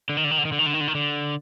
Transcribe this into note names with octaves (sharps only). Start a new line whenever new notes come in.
D3
D#3
D3
D#3
D3
D#3
D3
D#3
D3
D#3
D3
D#3
D3